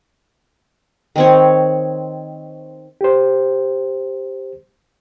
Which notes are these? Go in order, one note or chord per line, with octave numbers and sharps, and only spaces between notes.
D#3 C4 C#5
G4 C5